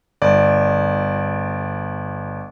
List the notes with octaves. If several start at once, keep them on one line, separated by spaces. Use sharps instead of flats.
G1 D5